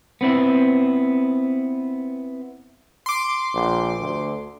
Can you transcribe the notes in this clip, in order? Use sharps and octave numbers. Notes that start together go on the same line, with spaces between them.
B3 C4 E4
C6 D6
A#1
D2